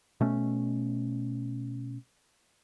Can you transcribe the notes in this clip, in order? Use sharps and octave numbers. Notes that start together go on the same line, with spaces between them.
B2 A3 C#4